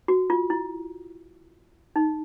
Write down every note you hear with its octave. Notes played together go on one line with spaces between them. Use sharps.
F#4
F4
E4
D#4